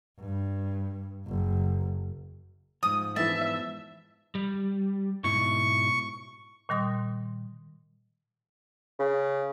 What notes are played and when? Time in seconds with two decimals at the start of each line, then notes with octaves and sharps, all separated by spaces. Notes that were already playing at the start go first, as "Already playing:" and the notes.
0.19 G2
1.27 F#1
2.83 G#2 F3 D#6
3.16 E3 B3 E4 E5 A5
4.35 G3
5.24 G#2 B2 E4 C#6
6.69 A#2 D#3 G3 C6 D#6
8.99 C#3